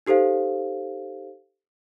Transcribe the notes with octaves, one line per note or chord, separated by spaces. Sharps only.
D#4 G4 A4 C5 F5